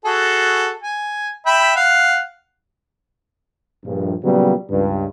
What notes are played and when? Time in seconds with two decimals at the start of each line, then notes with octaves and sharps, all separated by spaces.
0.05 F#4 G#4 A4
0.82 G#5
1.46 E5 G5 B5
1.76 F5 F#5
3.85 A#1 G2
4.24 A#2 C#3 F#3 G3 B3
4.70 C#2 G2